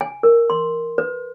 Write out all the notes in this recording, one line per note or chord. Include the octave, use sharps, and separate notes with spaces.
G#5
A#4
C6
B4